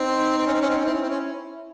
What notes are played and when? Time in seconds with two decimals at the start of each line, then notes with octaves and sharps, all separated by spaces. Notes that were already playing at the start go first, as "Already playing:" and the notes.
Already playing: C4 D#4
0.38 C4
0.47 C#4
0.53 C4
0.62 C#4
0.70 C4
0.78 C#4
0.86 C4 E4
0.94 C#4
1.02 C4
1.10 C#4